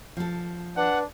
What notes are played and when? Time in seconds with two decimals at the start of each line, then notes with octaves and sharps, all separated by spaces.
0.17 F3 A4
0.77 D4 B4 F#5